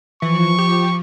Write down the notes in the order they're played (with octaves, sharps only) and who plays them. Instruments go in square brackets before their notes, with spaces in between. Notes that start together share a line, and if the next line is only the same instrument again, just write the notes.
[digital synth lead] E3 [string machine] F3 [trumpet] C#6
[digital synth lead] G4